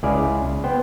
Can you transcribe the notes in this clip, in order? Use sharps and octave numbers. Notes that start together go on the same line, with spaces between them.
C#2 E4 G#4 D5 F5
B3 C5 G5